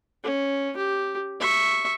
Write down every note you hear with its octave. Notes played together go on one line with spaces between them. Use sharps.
C#4
G4
E5 C#6